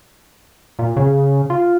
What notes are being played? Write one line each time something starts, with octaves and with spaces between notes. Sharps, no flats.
A#2
C#3
F4